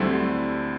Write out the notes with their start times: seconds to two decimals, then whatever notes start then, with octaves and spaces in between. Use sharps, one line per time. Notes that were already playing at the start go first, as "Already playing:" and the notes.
Already playing: D2 D3 G3 A3 C4 E4